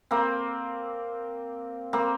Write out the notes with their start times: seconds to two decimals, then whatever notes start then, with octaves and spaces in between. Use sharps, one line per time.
0.11 A#3 C4
1.93 A#3 C4